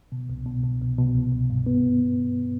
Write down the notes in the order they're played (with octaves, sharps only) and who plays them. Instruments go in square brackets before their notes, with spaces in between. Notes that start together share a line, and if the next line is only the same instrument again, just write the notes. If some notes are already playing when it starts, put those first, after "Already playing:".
[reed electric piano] B2
C2
B2
B2
C2
B2
C2
B2
G2
B3